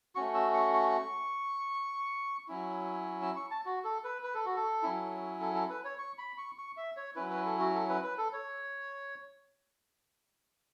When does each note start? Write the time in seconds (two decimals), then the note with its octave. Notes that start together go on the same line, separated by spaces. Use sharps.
0.15 A3 C#4 F#4 C#6
0.35 E6
0.54 C#6
0.73 C#6
2.48 F#3 C#4 E4
3.22 E6
3.36 C#6
3.51 A5
3.65 F#4
3.84 A4
4.04 B4
4.23 B4
4.35 A4
4.45 F#4
4.56 A4
4.83 F#3 C#4 E4
5.41 A4
5.55 A4
5.70 B4
5.85 C#5
5.98 C#6
6.18 B5
6.38 C#6
6.58 C#6
6.77 E5
6.97 C#5
7.16 F#3 C#4 E4 B4
7.30 B4
7.46 A4
7.59 F#4
7.74 A4
7.89 B4
8.04 B4
8.18 A4
8.33 C#5